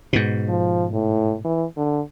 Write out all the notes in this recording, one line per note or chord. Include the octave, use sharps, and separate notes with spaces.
G#2 B2
F3
A2
E3
D3